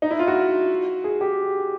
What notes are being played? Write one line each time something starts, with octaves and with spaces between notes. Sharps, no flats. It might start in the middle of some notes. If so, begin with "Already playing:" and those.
D#4
E4
F4
F#4
G#4
G4